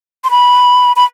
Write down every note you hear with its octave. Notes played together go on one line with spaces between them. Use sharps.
C6
B5
B5